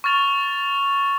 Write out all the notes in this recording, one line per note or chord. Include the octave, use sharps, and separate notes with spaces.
C#6 F6 A6 F7